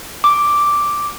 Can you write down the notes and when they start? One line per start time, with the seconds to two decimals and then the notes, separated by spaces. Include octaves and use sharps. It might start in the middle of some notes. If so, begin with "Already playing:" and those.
0.24 D6